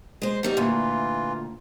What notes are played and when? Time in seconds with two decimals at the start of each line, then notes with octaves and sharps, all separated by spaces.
0.22 G#3 C5
0.43 F#2 G3 D#4
0.57 D2 A#2 E3 F4